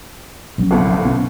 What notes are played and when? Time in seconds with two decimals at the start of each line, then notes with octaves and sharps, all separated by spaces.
0.58 A#1 F#3 C#4
0.71 G1 C2 F2
1.03 B1 B3 C#4